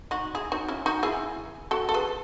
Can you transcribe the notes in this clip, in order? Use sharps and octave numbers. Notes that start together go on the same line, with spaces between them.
D#4 F#4
E4 G#4
D#4 F#4
C#4 E4
D#4 F#4
E4 G#4
F#4 A4
A4
G#4 B4